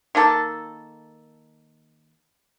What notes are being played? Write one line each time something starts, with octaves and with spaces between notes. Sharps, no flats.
D#3 A#3 A4 A5